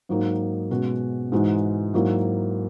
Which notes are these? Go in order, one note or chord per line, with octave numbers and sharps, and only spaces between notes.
G#2 F#3 A#3 D#4
B2 G#3 C#4 F#4
G#2 E3 G#3 D#4 F#4
G#2 F#3 A#3 E4